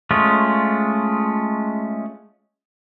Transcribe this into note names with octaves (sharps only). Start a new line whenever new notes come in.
G#3 A3 C#4 F4